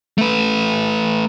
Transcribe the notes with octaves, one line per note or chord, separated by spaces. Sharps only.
A3 B4